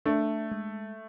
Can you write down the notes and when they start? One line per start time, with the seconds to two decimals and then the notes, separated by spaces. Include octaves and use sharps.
0.06 A3 D4
0.52 G#3